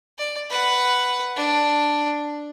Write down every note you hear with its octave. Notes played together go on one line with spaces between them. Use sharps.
D5
B4 F#5
D4